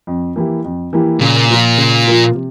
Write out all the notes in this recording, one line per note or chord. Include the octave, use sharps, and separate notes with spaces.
F2
E3 A#3 E4 G4
F2
E3 A#3 E4 G4
A#2 C#3
F3 A#3 F4
C#3
F3 A#3 F4
C3